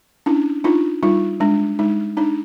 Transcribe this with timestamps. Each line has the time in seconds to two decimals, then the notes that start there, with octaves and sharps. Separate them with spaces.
0.26 C#4 D4 E4
0.64 D4 D#4 F4
1.03 G3 D#4 F4
1.40 G#3 D4
1.79 G#3 D#4
2.17 D4 D#4